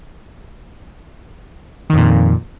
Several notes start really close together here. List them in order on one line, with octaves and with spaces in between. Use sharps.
D#3 F2 A#2